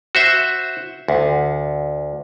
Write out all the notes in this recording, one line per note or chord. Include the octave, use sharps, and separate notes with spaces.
F#4 C5 E5
D2